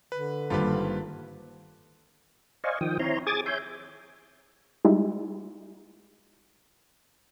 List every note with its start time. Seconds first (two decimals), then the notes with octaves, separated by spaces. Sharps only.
0.12 D3 B4
0.50 G#1 G2 D#3 G3 A#3 F4 G4 B4
2.64 C5 D5 D#5 F5 G#5 C#6
2.81 D#3 F3 G5 D#6
2.99 C4 E4 C#5 A#5 C6
3.27 G#4 D6 D#6 G#6 A6
3.46 C#5 E5 G#5 C6 G6
4.85 G3 G#3 D#4 E4 F#4